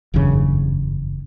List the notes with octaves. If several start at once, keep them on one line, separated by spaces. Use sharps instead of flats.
F#1 E2 G2 C#3